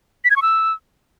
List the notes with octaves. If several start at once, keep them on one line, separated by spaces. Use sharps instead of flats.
B6
G#6
C#6
E6